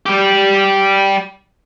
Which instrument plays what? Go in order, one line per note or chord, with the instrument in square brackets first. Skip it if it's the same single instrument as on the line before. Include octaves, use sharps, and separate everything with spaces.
[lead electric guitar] G3 G4